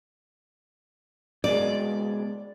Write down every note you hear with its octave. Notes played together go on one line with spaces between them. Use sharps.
C#2 B2 G#3 D5